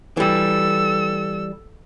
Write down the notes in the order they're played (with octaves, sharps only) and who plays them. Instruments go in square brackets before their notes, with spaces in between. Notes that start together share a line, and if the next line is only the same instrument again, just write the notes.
[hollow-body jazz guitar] E3 G3 [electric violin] A4 E6